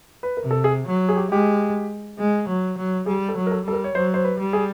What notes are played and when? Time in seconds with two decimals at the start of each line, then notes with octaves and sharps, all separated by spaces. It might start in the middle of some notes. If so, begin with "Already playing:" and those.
0.23 B4
0.37 A#4
0.43 C3
0.51 A4
0.64 G#4
0.86 F#3
1.09 G#4
1.16 G4
1.31 G#3 G4
2.18 G#3
2.48 F#3
2.77 F#3
3.06 G3 G#4
3.29 A4
3.36 F#3
3.46 A#4
3.51 A4
3.65 G3 A4
3.73 A#4
3.84 C#5
3.95 F#3 C5
4.14 C5
4.24 B4
4.38 G3
4.53 G#4